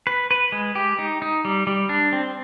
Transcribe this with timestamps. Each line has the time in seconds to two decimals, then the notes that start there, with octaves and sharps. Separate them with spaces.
0.07 B4
0.31 B4
0.52 G#3
0.75 G4
0.99 D#4
1.22 D#4
1.45 G3
1.67 G3
1.89 D4
2.13 C4